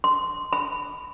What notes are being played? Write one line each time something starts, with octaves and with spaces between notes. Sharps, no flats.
C6
B5